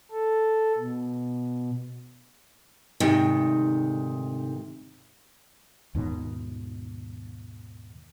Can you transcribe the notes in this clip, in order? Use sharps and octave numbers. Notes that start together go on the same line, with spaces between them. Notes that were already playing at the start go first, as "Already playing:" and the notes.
A4
B2
D2 G#2 C3 D#3
D#2 G#2 B2 D#3